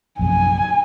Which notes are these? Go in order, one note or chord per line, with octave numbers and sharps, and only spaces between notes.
A#1 F#2 C3 G#5